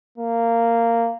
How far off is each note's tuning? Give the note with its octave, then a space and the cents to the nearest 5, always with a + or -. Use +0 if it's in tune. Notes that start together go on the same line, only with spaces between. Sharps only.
A#3 -15